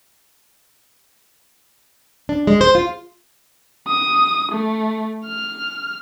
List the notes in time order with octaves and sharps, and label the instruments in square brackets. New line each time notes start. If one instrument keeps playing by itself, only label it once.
[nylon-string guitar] D4
G#3
C5
F4
[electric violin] D#6
A3
F6